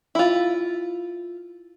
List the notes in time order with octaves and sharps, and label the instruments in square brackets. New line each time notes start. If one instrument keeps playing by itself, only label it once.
[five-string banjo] E4 F4